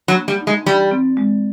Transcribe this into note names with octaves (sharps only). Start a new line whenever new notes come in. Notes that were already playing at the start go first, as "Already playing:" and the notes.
F#3
A#3
G3
D#4
G#3
E3 G3
C4
G#3